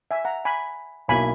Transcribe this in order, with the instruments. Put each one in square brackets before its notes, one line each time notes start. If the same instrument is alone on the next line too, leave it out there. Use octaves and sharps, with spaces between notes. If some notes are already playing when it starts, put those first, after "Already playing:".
[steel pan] E5 G#5
F#5 A#5
G#5 B5
[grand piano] B1 B2 A#3 E4 [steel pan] G#5 B5